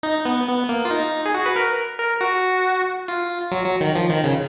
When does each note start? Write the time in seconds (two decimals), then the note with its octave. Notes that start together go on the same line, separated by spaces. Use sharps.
0.03 D#4
0.25 B3
0.48 B3
0.69 A#3
0.85 F4
0.91 D#4
1.26 G#4
1.35 F#4
1.46 B4
1.56 A#4
1.99 A#4
2.21 F#4
3.08 F4
3.52 F#3
3.66 F#3
3.81 D#3
3.95 F3
4.10 D#3
4.24 C#3